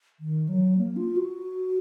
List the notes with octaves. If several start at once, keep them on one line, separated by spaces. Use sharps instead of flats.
D#3
F#3
A#3
F4
F#4